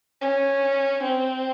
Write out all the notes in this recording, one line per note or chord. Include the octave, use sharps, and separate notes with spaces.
C#4
C4